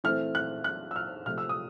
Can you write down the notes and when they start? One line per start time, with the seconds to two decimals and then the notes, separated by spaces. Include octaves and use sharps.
0.04 E3 A3 C4 F6
0.35 F#6
0.64 F#6
0.91 E6
0.96 F6
1.26 C3 F3 A3 F6
1.38 E6
1.49 D#6